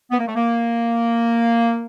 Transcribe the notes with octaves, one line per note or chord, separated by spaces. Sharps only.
B3
A#3
A3
A#3